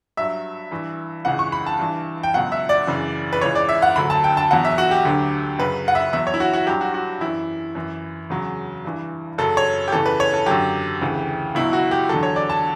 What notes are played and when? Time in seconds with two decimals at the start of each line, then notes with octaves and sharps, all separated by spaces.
0.17 G2 F#3 E5
0.71 G2 E3
1.25 C#2 C#3 E3 F#5
1.39 C#6
1.52 B5
1.66 A5
1.79 G2 E3
2.23 G5
2.34 C#2 B2 F#3 F#5
2.52 E5
2.69 D5
2.87 F#2 C#3 E3
3.33 B4
3.41 C#2 C#3 E3 C#5
3.55 D5
3.69 E5
3.82 F#5
3.96 D2 D3 F#3 B5
4.10 A5
4.24 G5
4.37 A5
4.51 E2 B2 F#3 F#5
4.65 E5
4.78 F#4
4.91 G4
5.05 D2 D3 F#3
5.59 F#2 C#3 F#3 B4
5.88 F#5
5.95 E5
6.13 E2 B2 F#3 E5
6.27 C#5
6.34 E4
6.40 F#4
6.53 F#4
6.67 G2 F#3 G4
6.81 F#4
6.94 F#4
7.21 F#2 E3 E4
7.75 F#2 E3
8.30 E2 C#3 F#3
8.85 G2 E3
9.38 F#2 C#3 F#3 A4
9.57 C#5
9.88 G4
9.92 E2 C#3 E3 A4
10.06 B4
10.20 C#5
10.34 A4
10.46 F#2 D3 F#3 G4
11.01 D2 C#3 E3
11.55 C#2 B2 F#3 E4
11.73 F#4
11.91 G4
12.09 E2 D3 F#3 A4
12.23 C#5
12.36 D5
12.50 A5